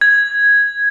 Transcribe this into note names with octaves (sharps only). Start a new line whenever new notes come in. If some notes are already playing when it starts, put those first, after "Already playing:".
G#6